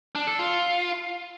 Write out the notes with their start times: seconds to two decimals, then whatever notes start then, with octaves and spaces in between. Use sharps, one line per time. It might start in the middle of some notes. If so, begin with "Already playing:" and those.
0.15 D4
0.27 A4
0.39 F4